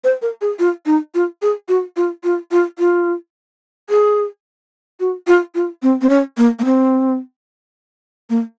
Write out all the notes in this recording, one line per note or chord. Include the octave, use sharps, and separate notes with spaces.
C5
A#4
G#4
F4
D#4
F4
G#4
F#4
F4
F4
F4
F4
G#4
F#4
F4
F4
C4
C4
C#4
A#3
A#3
C4
A#3